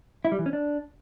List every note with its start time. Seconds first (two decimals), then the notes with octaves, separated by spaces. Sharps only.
0.25 E4
0.32 G3
0.39 E3
0.46 C#4
0.53 D4